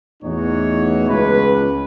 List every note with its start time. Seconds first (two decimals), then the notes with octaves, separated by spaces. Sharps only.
0.23 E2 A2 E3 D#4 F#4 C#5
1.08 C#2 B4